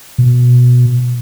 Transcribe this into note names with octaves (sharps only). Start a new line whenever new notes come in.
B2